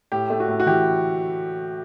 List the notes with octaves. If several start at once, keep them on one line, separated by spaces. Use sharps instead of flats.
A2 G4
A3
F#4
A2
F#4
E3 G4